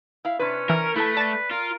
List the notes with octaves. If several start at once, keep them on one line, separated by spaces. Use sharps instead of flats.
E4 F5
C3 C#4 D4 B4
E3 A#4
A3 E4 A4 B4 A5
D5 A5 A6
F4 A#4